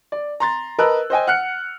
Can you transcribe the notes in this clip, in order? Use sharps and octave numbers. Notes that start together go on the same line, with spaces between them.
D5
A#5 C6 A6
A#4 B4 D#5 A5 E6 F#6
C5 D#5 G5 G#5
F#5 F6 F#6 C#7